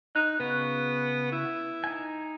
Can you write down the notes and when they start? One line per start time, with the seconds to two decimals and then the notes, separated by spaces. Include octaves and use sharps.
0.16 D#4 F#6
0.40 C#3 B3 F#4
1.32 E4
1.84 D#4 G#5